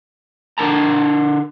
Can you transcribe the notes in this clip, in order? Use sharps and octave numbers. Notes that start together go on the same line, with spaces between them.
D3 D4 A#4 A5 A#5